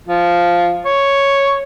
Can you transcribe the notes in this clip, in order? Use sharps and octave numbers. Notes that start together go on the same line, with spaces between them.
F3
C#5